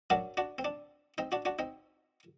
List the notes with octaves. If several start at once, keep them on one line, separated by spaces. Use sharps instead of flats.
F#2 F#3 D4 F#4
D4 F#4
C4
D4
C4 D#4
D4 F#4
D4 F#4
C4 D#4